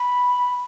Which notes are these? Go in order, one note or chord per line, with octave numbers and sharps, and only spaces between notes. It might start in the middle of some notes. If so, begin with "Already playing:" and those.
Already playing: B5